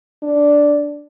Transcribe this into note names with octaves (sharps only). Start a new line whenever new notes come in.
D4